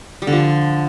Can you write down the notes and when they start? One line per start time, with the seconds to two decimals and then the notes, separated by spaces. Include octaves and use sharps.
0.22 G3
0.27 D3
0.32 F3